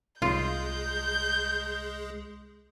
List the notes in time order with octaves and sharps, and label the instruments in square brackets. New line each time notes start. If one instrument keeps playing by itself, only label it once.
[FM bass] C2 [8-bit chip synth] G#3 G#4 [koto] F4 [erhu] G6